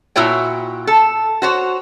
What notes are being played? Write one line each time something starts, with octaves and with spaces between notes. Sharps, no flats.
A#2 E4 F#4 C#5 G5
A4
F#4 C5 C#5